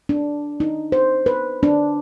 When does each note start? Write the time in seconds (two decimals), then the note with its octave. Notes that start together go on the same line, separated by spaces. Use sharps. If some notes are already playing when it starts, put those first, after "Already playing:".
0.09 D4
0.60 D#4
0.92 C5
1.26 B4
1.63 D4